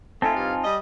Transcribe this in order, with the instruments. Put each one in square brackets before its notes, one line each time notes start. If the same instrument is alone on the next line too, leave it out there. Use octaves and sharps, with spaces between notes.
[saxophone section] A3 [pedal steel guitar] C4 D#4 F4 [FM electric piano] G#5 A5
[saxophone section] G2 G4 F5
G3 D#5